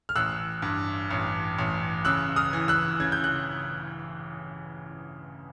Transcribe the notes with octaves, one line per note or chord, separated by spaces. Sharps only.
F6
A1 E6 F#6
G2
A1
A1
C#3 E6 F#6
D#6 F6
E3
E6 F#6
C#3 G#6
G6
F#6